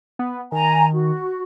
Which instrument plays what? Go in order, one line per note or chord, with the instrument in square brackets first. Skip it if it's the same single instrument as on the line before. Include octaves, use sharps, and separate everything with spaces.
[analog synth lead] B3
[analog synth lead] D#3 [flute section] G#5 A#5
[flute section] F#4